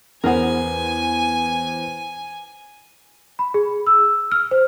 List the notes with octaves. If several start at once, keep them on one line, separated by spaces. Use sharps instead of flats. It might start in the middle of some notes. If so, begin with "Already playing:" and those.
E2 B3 G#4 A#4 C5 G#5
B5
G#4
E6
F6
C5